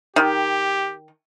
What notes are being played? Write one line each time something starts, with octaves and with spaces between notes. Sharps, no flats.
D#3 G4